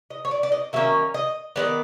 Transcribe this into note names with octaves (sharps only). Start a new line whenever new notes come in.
D#5
C#5
D5
D5
D#5
D#3 F#3 A#3 C#4 E5
D#5
D#3 G#3 B3 D5